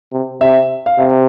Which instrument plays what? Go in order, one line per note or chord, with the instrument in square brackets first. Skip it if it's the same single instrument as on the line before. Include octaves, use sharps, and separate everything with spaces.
[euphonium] C3
[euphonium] C3 [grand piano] E5
[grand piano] F5
[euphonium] C3 [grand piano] E5